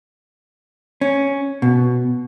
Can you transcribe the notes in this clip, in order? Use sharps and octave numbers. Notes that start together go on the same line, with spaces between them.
C#4
B2